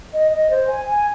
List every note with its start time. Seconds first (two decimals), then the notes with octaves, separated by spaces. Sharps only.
0.13 D#5
0.31 D#5
0.49 C5
0.68 G#5
0.87 G#5